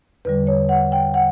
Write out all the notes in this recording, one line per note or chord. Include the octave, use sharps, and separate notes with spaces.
E2 D3 G3 B4
C#5
F#5
G5
F#5